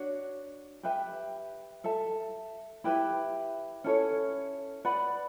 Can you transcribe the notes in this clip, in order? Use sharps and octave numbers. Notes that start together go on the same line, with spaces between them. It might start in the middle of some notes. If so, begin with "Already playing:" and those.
Already playing: D4 F#4 C#5
G4 B4 E5 G5
A4 E5 A5
E4 G4 B4 E5
C#4 E4 A4 C#5
B4 D5 F#5 B5